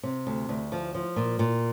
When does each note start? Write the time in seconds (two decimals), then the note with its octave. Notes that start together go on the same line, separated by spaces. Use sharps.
0.03 C3
0.27 D2
0.49 D2
0.72 F3
0.95 F3
1.16 A#2
1.39 A#2